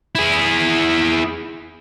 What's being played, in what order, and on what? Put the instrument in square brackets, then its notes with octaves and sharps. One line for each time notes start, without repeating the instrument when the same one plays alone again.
[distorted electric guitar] E4 G#4